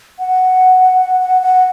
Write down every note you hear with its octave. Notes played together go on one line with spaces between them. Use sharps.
F#5
F#5
F#5
F#5